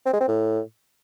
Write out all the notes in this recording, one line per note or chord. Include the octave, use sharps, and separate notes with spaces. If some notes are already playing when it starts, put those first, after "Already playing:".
C4
G#3
C4
A2